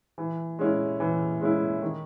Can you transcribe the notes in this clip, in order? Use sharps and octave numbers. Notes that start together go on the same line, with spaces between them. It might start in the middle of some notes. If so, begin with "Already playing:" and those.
E3
G#3 C#4 E4
E3
G#3 C#4 E4
D#3